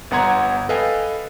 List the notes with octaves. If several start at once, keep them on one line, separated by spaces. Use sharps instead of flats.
G1 B3 F#5 A#5 C6 G#6
A4 B4 D#5 F5 G5 G#5